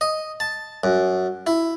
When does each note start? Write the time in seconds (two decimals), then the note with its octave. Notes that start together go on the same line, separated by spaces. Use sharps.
0.01 D#5
0.40 A5
0.84 F#2
1.47 E4